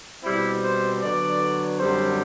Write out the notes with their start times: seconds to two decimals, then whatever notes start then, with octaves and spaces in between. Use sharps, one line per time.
0.23 B2 G3 C4 E4
0.62 C5
1.01 D3 F#3 B3 D5
1.78 F#2 D3 G3 C4 C5